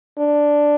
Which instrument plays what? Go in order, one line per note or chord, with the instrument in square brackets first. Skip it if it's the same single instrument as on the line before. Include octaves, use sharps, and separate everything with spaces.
[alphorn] D4